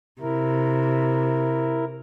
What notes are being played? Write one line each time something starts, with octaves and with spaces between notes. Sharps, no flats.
C3 E4 A#4